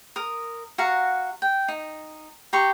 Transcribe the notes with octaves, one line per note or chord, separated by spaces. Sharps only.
A#4 D#6
F#4 F5 F#5 A#5
G5
D#4
G4 A#5 C6 C#6